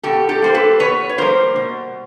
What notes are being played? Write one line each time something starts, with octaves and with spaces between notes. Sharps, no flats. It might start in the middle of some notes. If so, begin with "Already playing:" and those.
B2 G4 A4
G4 A4
G3 A#3 C5
A4 B4
B2 B4 C#5
C#5
G3 A#3 A#4 C5
B2